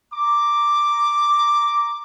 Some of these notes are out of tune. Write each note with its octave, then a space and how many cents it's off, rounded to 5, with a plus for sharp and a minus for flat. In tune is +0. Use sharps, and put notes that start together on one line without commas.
A#5 +0 D6 +0